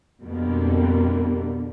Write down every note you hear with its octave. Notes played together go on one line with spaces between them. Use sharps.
F2 B2 D3 G3 A#3